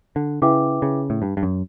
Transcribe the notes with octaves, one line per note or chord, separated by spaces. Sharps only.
D3
C#3 E4 B4 E5 G5 D6
C#3
A2
G2
G2
F#2